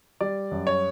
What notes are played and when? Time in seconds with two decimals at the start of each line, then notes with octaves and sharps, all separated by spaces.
0.21 G3 D5
0.51 F#2
0.67 C#5